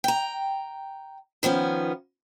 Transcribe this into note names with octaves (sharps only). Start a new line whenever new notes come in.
G5 A#5
D#3 F3 B3 C#4